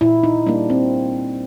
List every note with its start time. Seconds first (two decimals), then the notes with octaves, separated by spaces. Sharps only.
0.01 A#2 E4
0.23 D#4
0.46 G3 A#3 D4
0.70 C4